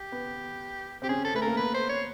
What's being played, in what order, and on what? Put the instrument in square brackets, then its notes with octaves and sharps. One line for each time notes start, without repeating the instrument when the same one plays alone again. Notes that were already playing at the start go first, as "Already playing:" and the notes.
Already playing: [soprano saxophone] G4
[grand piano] B3
[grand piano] C4 [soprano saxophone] G4
[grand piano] C#4 [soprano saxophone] G#4
[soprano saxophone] A4
[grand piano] A3 [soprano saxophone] B4
[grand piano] A#3 [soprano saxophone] A#4
[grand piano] B3 [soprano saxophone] B4
[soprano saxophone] C5
C#5